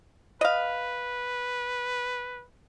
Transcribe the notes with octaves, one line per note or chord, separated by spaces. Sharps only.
B4 D#5 F5